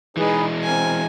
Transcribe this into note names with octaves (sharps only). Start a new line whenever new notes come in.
E3 G#3 D#4 G#4 B4
C4 A#4 G#5